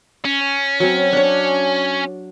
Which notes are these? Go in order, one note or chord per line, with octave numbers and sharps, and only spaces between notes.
C#4
F#3 C4
D4 C#5